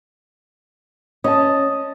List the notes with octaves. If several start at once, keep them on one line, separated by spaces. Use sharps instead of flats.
C#4 D#5 A5